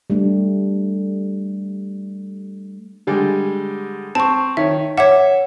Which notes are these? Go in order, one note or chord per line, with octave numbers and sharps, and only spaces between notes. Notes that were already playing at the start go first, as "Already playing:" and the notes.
G3 A3 D4
D3 G3 G#3
C4 A5 C#6
D#3 C#5 E5
C#5 E5 F#5 D6